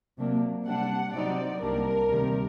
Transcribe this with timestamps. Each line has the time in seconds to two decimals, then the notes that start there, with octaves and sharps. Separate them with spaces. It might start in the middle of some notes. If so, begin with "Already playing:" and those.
0.18 C3 F#3 A#3 D4
0.66 C3 G3 D4 F#5
1.13 C3 F#3 C4 D#4 D5
1.61 C2 C3 G3 A#3 D4 A#4
2.10 D2 C3 D#3 G3